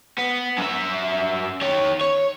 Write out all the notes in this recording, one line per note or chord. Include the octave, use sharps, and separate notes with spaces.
B3
F#2 E5
D#3 C#5
C#5